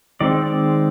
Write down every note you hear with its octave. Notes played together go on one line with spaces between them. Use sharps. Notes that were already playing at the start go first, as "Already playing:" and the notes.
D#3 G#3 C4 D5
D5